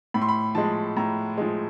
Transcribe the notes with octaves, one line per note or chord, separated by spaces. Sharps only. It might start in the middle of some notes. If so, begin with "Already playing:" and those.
A2 B5
C6
B5
F3 G#3 A5
A2 A#5
F3 G#3